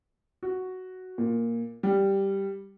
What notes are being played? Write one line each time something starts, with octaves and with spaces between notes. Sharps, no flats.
F#4
A#2
G3